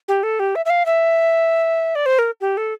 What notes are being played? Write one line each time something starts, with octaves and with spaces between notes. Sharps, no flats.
G4
A4
G4
E5
E5
F5
E5
D5
C5
A#4
G4
A4